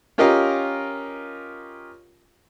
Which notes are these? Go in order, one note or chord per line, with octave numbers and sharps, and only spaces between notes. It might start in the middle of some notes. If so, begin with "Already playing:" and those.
C#4 F4 G4 A#4 D#5 F5